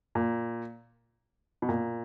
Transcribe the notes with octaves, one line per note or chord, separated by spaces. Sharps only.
A#2
B2
A#2